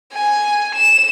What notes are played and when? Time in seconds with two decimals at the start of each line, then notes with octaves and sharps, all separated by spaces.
0.13 G#5
0.75 E7